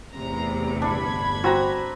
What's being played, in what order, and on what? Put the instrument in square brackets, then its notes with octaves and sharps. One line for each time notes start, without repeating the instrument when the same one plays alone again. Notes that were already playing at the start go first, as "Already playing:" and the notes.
[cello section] E2 A2 C3 [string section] A#5
[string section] G1 B5 G#6 [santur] D4
[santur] C4 B4 A#5 [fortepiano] F#4